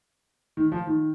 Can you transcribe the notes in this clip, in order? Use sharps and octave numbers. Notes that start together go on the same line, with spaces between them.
D#3
F3
D#3